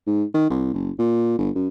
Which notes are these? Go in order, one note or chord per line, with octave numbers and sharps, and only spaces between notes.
G#2
D#3
C2
F#1
A#2
G1
F#2